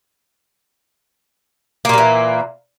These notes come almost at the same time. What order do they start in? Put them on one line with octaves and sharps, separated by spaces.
A#3 A#2 G3 E3